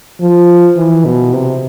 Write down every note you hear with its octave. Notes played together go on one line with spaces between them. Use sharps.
F3
E3
B2
C3